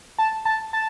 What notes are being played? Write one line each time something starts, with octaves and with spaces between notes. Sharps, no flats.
A5
A5
A5